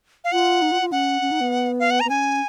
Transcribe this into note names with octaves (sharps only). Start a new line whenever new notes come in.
F5
F4 F#5
D#4
F4
F4
C#4 F#5
C#4
D#4
B3
F5
F#5
A#5
B3
C#4 G#5